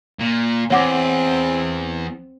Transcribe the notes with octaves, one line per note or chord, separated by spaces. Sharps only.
A#2
E2 C4 C#5 F#5 D6